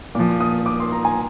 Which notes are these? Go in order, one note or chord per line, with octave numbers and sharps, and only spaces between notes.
A#2 F3 D6
D#6
D6
C6
A#5
G#5